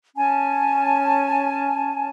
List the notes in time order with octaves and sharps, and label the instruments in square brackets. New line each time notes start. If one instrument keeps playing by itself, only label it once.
[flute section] C#4 G#5 A5